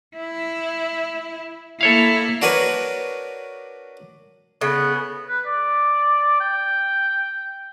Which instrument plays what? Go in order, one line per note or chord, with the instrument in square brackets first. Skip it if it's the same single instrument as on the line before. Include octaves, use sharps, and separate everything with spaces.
[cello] E4
[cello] A#3 E4 [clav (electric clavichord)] A4 C#5 F5
[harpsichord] D4 F#4 A#4 B4 C#5
[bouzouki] C#3 [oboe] B3
[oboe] B4
D5
G5